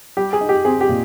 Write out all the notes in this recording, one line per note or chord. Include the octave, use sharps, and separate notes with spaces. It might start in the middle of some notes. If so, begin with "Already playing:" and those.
G3 G4
G#4
D#4
G4
C4 G#4
G4
A#2